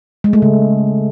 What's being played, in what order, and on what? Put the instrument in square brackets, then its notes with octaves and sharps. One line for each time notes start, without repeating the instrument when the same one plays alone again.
[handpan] G#3
A3
C#3